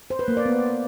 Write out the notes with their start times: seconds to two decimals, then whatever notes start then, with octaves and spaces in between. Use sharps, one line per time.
0.10 C5
0.19 B4
0.28 A#3
0.37 D5
0.46 B3